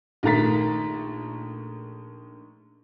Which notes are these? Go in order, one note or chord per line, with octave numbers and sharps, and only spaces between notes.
A#1 D#3 A3 A#5 A6 B6